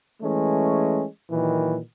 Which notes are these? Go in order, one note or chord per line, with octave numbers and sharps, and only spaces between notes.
E3 G#3 A3 C#4
A#2 D#3 E3 F#3